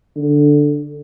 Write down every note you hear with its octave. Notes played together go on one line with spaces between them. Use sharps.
D3